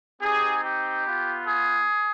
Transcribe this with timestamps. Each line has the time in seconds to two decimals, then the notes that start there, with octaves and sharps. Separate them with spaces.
0.21 C4 D#4 G4 G#4
0.63 G4
1.05 B3 F4
1.47 G#4